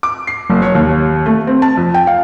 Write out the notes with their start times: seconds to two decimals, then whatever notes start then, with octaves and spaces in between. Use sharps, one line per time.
0.03 D6
0.27 C7
0.50 F#1
0.62 C#5
0.75 D#2
1.26 A3
1.47 C4
1.62 A5
1.77 F2
1.94 G5
2.07 F5